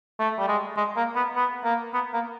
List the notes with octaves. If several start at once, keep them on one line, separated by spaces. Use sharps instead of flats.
A3
G3
G#3
G#3
A#3
B3
B3
A#3
B3
A#3